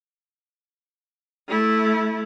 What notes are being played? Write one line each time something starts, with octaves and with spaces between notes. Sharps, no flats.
A3 E4